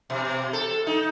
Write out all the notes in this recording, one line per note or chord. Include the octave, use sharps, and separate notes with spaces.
B2
A4
D#4